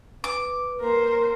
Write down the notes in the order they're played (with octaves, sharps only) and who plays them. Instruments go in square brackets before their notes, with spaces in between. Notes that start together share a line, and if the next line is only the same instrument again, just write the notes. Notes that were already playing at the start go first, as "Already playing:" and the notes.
[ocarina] B4 [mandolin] D6
[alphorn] A#3 [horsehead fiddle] A#4 C5